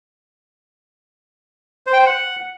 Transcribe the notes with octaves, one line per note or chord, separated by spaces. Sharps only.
C5
G5
C5
F#5